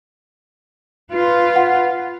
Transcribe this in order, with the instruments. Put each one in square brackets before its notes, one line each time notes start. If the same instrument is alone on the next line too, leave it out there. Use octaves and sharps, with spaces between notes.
[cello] F4 B4
[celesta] F#5